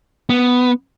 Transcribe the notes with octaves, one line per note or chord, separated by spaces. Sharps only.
B3